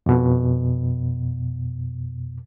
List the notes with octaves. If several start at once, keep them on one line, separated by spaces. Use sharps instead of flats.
F2 B2